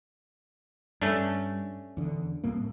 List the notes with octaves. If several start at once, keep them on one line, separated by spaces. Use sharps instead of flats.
G2 A3 C#4 D4
E2 D3
C2 A2 A#3